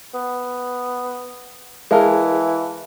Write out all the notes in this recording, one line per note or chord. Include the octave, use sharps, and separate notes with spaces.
B3
E3 G#3 A#4 E5 F5 A5